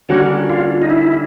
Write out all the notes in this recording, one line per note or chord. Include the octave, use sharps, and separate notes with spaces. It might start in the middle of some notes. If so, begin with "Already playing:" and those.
D3 G3 A#3 C#4 F#4
F4
D#4
E4